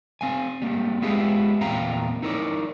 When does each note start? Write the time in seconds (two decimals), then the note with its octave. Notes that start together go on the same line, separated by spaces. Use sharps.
0.21 C4 F5 G#5
0.62 G3 A#3 C4
1.02 G#3 B3 E4 F4 G4 G#4
1.61 E2 A#2 C4 F5 G5 A#5
2.22 D#4 E4 A#4 C#5 D5